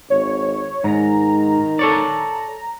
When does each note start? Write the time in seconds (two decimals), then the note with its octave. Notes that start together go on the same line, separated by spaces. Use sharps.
0.10 G#1 C#5
0.84 G#2 D#3 A#5
1.79 A4 C#5 D5